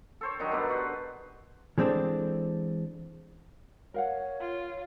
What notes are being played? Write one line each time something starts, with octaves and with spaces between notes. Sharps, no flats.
A4 C5 C#5
D#3 F#3 D4 D#4
G2 B2 B4 D5
F#4 B4 C5
E3 G#3 C4 D4 A4
A#4 C#5 F5 F#5
F4